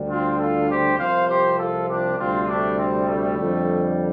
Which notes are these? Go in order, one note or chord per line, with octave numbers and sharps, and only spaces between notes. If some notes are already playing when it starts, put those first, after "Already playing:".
Already playing: D2 D3 G3
C4 F4
F4 A4
G4 C5
C2 C3 F3 C5 F5
G4 C5
F4 A4
D4 G4
D2 C3 G3 C4 F4
A3 D4
C4
A3
F2 D3 G3